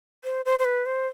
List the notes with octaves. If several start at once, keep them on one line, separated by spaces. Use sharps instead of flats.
C5
C5
C5
B4
C5